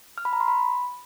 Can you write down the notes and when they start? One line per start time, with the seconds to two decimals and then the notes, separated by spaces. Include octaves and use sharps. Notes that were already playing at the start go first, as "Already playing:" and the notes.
0.18 F6
0.25 B5
0.33 A#5
0.40 C6
0.48 B5